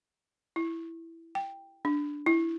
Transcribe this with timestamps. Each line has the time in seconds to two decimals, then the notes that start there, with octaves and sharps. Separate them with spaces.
0.56 E4
1.35 G5
1.85 D4
2.26 E4